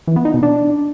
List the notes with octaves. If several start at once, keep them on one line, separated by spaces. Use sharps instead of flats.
E3
B3
D#4
B2
D4